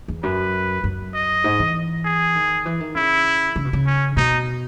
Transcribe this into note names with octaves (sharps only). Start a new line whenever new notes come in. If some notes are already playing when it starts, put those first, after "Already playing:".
E2
F#2 B4
F#2
D#5
G#2
E3
G#4
D#3
E3
D#3
C#3 E4
C#3
B2
C#3
C#4
B2 D#4